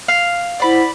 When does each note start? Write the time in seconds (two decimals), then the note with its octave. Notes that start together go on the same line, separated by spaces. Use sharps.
0.08 F5
0.60 E4 C5 D5 F#5 B5